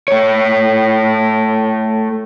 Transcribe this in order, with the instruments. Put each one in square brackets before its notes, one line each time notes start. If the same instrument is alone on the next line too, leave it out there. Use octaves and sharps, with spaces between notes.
[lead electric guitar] A3 C#5